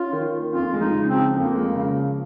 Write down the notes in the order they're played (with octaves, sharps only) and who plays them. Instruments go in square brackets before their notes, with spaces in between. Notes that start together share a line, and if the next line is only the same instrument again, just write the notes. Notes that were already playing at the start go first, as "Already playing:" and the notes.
Already playing: [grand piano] C#4 [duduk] F4
[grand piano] D#3
A#3
[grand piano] F2 [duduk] F4
[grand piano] G#3
[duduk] D#4
[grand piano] C#3
[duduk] C4
[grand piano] F3
[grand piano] F2 [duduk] A#3
[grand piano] G#3
C#3
F3